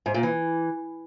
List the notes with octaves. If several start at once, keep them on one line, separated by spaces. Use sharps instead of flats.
G#2
A#2
E3